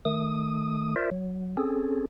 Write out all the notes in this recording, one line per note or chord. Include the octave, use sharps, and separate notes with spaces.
D#3 A3 D#6
F4 A#4 C5 D5 E5
F#3
C4 C#4 G#4 A4